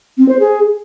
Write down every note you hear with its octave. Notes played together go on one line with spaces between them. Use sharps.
C4
C5
G#4